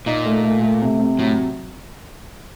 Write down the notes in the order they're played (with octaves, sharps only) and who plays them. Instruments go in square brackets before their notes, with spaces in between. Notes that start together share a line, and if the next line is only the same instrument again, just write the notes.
[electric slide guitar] A#2 [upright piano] D#4
[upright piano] A3
A3
A3
C3
C3
[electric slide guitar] A2 [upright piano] F#3